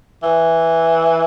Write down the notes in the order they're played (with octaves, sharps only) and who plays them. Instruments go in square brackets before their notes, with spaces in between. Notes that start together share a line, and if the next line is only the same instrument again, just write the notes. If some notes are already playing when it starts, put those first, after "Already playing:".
[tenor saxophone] E3